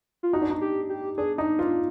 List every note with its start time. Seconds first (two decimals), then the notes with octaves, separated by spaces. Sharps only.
0.23 F4
0.33 D#4 F#4
0.42 D4
0.50 D#4
0.61 G4
0.89 G4
1.17 D4 G#4
1.38 D4 D#4
1.59 D4 F4